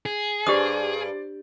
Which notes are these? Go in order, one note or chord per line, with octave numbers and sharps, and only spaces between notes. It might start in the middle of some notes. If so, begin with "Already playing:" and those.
G#4
G2 G4 C5 D5 D#6